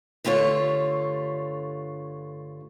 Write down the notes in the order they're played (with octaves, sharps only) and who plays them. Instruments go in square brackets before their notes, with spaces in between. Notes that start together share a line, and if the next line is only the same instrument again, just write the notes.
[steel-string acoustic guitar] G2 D3 A3 F4 B4 C#5